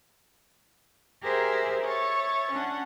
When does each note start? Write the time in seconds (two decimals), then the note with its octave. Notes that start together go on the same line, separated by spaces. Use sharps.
1.22 G4 G#4 A#4 C5 E5
1.83 C#5 E5 C#6 A6
2.51 C#4 D4 F#5